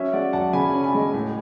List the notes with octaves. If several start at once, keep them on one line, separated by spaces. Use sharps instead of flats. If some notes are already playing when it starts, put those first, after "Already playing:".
Already playing: F#3 C#4 C#5 E5
G#3 D5 F#5
F#2 F#5 A5
C#3 G#5 B5
C#4
G#5 B5
G#3
A2